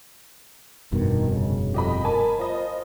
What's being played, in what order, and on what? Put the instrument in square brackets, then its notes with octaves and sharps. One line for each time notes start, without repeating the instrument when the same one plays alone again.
[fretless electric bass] F1 G2 B2 [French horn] D#3
[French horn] C#3
[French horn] F2 [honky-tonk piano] G4 D#5 B5
[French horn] A#4 [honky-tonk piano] G#5 A5 B5
[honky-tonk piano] F4 D#5 [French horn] C5